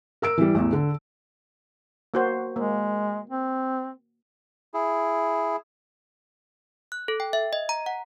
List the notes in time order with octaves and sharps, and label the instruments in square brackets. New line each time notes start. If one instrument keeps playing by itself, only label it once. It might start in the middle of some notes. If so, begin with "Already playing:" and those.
[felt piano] A#4 E6 D7
E3 G3
A1 E2
D3
[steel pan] A#3 F#4 C5
[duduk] G#3 [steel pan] A#3
[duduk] C4
[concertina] E4 G#4
[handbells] F#6
A4
G5
E5
D#5
A#5
F#5